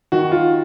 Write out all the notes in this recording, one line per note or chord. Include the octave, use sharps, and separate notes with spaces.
D#3 F#4
F4